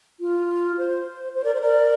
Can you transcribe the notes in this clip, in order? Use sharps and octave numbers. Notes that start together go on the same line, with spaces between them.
F4
C5
C5
A#4 D5
C5
A#4 D5